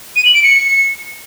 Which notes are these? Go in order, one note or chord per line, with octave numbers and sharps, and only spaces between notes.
D#7
F#7
D7
C#7